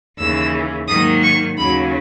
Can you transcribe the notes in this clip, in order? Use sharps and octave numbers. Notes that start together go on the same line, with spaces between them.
D#2 C#3 E3 E6
G#2 D#3 F#3 A#3 D#6
C#6
D#2 C#3 F#3 B5